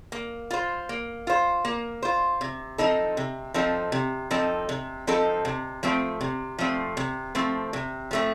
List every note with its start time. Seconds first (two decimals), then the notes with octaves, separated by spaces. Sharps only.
0.12 A#3
0.51 F4 C5
0.89 A#3
1.27 F4 C5
1.65 A#3
2.02 F4 C5
2.41 C3
2.78 F3 C4 D#4 A4
3.17 C3
3.54 F3 C4 D#4 A4
3.92 C3
4.31 F3 C4 D#4 A4
4.69 C3
5.07 F3 C4 D#4 A4
5.45 C3
5.83 F3 A3 C4
6.21 C3
6.58 F3 A3 C4
6.97 C3
7.35 F3 A3 C4
7.73 C3
8.11 F3 A3 C4